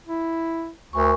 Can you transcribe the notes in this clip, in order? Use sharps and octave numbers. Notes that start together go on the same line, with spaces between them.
E4
D2 A#4 G#5 C#6